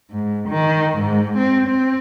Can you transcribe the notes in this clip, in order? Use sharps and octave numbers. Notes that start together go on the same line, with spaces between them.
G#2
D#3
G#2
C4
C4